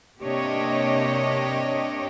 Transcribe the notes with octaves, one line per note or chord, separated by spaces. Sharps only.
C3 A#3 D4 G4 C#5 D#5